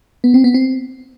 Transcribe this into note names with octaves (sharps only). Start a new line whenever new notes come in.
B3
C4
B3
C4